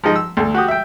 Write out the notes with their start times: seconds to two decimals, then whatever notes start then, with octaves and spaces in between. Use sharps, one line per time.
0.04 F3 G#3 D#4
0.16 E6
0.37 D2 A4
0.54 F#4 G4 D#6
0.68 E5 G5